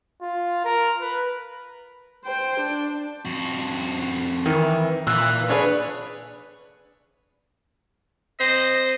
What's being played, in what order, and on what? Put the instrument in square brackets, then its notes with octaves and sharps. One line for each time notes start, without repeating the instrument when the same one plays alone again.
[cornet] F4
A#4
B4
[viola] C5 G5
D4
[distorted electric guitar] F2 F#4
[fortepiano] D#3 [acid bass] E3
[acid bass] A#2 [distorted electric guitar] E3 [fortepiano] E6 F#6
[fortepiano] D4 G#4 B4 [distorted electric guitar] C#5
[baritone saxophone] C4 [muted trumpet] D#5